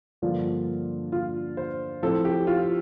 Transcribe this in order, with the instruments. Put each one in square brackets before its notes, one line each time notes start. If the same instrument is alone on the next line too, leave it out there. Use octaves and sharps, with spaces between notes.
[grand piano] G2 D3 F3 A#3 D4 F4
F4
C5
A2 F3 C4 A4
G4
F4